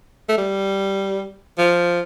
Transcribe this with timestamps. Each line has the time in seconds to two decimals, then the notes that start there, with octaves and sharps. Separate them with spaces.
0.29 A3
0.38 G3
1.58 F3